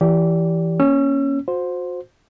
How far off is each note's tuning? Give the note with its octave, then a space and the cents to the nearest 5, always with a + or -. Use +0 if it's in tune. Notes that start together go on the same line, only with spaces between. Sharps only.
E3 +15 G4 +0 D5 -20
A#3 +25 C#4 +0 E6 +40
F#4 -35 C5 +0